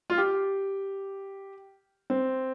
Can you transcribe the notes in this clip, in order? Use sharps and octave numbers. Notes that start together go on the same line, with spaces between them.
F4
G4
C4